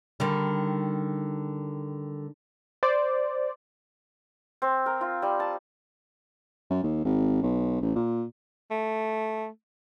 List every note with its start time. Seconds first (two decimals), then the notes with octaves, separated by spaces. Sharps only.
0.20 D3 D#3 G3
2.83 C5 D5
4.62 C4
4.86 A#4
5.01 F4
5.22 G3
5.40 A5
6.70 F#2
6.83 D#2
7.05 G#1
7.42 B1
7.81 A1
7.96 A#2
8.71 A3